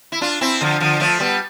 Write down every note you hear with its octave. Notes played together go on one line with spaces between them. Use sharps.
E4
D4 F4
C4 E4
D3 F3
D3 F3
F3 A3
G3 B3